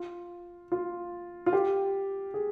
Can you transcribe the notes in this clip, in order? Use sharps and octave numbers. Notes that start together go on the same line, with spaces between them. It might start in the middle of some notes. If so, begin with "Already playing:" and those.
Already playing: F4
F4
F4
G4
G#4